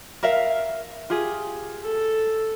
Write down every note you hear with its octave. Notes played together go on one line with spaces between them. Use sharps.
A#4 E5 F5
F4 G4 G#4
A4